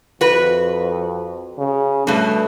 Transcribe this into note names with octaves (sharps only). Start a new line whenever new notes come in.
F2 F#4 B4
C#3
G2 B2 A3